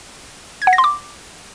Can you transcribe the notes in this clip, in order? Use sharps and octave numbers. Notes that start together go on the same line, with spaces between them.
G#6
F#5
A#6
C6
D6